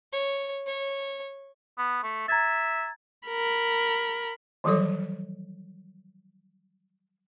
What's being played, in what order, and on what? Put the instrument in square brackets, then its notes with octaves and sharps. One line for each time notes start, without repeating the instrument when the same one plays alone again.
[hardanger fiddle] C#5
C#5
[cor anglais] B3
A3
[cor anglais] E5 [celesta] A#5 G#6 A6
[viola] A#4 B5
[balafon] D#3 E3 F#3 G3 A4 C#5